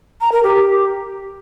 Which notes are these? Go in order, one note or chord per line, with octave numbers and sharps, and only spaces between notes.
A#5
A#4
G4